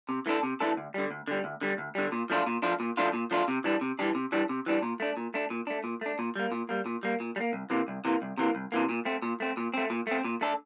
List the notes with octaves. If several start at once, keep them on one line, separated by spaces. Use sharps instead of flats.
C3
E3 A3 D4 A4
C3
E3 A3 D4 A4
D2
D3 G3
D2
D3 G3
D2
D3 G3
D2
D3 G3
A#2
F3 A3 D4 F4
A#2
F3 A3 D4 F4
A#2
F3 A3 D4 F4
A#2
F3 A3 D4 F4
C3
E3 G3 D4
C3
E3 G3 D4
C3
E3 G3 D4
C3
E3 G3 D4
A#2
A3 D4
A#2
A3 D4
A#2
A3 D4
A#2
A3 D4
A#2
G3 A#3
A#2
G3 A#3
A#2
G3 A#3
A#2
G3
A#3
C2
C3 E3 A#3
C2
C3 E3 A#3
C2
C3 E3 A#3
C2
C3 E3 A#3
A#2
A3 C4
A#2
A3 C4
A#2
A3 C4
A#2
A3 C4
A#2
A3 D4 A4